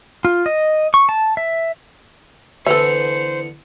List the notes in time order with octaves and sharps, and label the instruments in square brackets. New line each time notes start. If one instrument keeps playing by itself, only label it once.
[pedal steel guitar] F4
D#5
C#6
A5
E5
[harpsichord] D3 E3 B3 [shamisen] A4 E5 [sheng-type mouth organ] C5 [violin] C#7